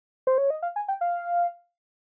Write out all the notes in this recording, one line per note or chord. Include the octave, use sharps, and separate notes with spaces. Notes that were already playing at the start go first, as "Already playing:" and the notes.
C5
C#5
D#5
F5
G#5
G5
F5